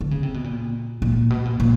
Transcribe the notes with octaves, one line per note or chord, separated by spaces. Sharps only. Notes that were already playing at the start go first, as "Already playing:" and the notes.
D3
C#3
C3
B2
A#2
A#2
B2
A#2
A#2